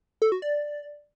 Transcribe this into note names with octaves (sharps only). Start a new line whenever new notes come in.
A4
F#4
D5